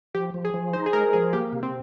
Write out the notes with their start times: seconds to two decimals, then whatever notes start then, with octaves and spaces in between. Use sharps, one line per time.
0.14 F3 G4
0.34 F3
0.45 G#4
0.54 F3
0.73 D#4 C5
0.86 G#4
0.93 G#3 A#4
1.13 F3 G#4
1.33 A#3 G4
1.53 C3
1.63 C4